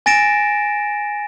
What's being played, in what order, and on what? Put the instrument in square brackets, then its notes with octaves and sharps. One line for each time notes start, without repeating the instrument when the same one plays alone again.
[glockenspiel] G#5 A6 A#6 D7 E7